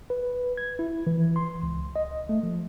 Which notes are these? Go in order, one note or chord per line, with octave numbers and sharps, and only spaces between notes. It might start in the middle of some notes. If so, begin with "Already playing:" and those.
B4
G#6
E4
E3
C6
C#2
D#5
A3
F3